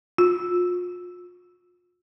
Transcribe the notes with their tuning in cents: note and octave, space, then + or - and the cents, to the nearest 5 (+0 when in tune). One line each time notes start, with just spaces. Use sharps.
F4 +35